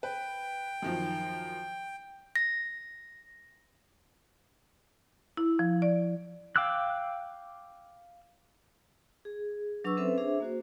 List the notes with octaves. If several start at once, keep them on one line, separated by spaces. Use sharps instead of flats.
B4 G5
F#2 D#3 F3
A#6
E4
F3
D5
F5 G5 D6 E6 F#6
G#4
F#3 D4 B4 C#6 D6 E6
C4 C#4 A4 B4 C5 E5
D4 G#4 C5 E5
A#3 F#4 C5